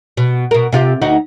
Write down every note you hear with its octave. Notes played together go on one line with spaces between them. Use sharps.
B2
B2 A#4
C3 F4 G4
D2 D#4 F#4